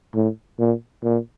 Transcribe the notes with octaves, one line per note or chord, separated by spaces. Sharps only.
A2
A#2
A#2